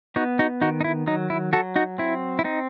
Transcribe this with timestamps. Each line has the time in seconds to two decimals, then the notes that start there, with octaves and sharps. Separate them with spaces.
0.16 B3 D#4 F#4
0.39 D#4 F#4
0.61 D#3 D#4 F#4
0.81 D#4
0.84 E4
1.07 F#3 D#4
1.30 E4
1.53 F#3 F#4 A4
1.76 D#4 F#4
1.98 C4 E4
2.39 E4
2.44 C4 D#4